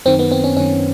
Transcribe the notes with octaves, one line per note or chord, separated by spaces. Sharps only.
F#2 D#3 C4
B3
C4
C#4
F#2 D#3 C#4